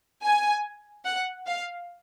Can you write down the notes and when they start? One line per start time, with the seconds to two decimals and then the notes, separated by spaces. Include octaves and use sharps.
0.25 G#5
1.05 F#5
1.46 F5